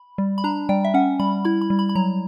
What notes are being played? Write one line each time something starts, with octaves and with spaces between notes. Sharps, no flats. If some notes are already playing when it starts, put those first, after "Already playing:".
Already playing: B5
G3
B5
D4 A#5
G3 G5
E5
C#4 F#5
G3 B5
E4 B5
B5
G3
B5
B5
F#3 A#5